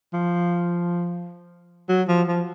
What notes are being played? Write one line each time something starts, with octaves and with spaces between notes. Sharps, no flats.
F3
F#3
F3
F3